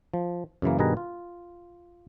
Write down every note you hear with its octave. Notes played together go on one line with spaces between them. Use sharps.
F3
F#2 C#3 E3 A#3
G2 B2 D#3 G#4 B4 A#5
F4